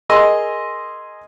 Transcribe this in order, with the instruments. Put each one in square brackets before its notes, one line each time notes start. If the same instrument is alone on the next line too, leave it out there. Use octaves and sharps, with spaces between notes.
[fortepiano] G#4 A#4 D#5 C6 E6